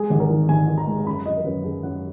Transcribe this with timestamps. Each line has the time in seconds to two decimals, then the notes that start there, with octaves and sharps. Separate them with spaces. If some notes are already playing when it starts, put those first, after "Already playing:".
Already playing: G#3 G#4
0.10 G#1
0.20 A#4
0.30 D#3
0.49 G#1 G#5
0.68 D#3
0.78 A#5
0.87 G#3
1.06 F#2 B5
1.26 F#2 D#5
1.36 A#4
1.45 F#2 B4
1.64 F#2 G#4
1.83 F#2 F#5